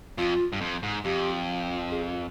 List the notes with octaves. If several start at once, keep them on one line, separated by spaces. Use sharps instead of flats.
F2 F4
G2
F2
G#2
F2 G4
G#4